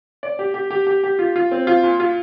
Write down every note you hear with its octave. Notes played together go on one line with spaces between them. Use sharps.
D5
G4
G4
G4
G4
G4
F4
F4
C4
F4
A#2
F4